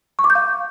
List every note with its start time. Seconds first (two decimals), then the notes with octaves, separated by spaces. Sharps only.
0.19 C#6
0.24 D6
0.30 G6
0.35 F5